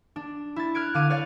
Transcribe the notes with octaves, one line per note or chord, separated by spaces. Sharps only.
D4
E4 A6
F6 F#6 G#6 D7
D3 F5 D6 G#6 D#7
C#5 D5 F5 A6